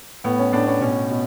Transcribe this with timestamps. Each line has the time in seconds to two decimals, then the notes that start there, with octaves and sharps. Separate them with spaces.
0.24 A2 B3
0.39 C#4
0.53 A2 D4
0.67 C#4
0.81 B2 C#4
1.10 B2